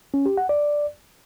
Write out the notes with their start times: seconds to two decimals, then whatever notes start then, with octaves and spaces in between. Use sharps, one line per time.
0.14 C#4
0.26 G4
0.37 F#5
0.49 D5